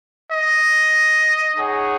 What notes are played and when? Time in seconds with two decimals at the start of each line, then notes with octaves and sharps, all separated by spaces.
0.32 D#5
1.57 D#4 G#4 C#5 F#5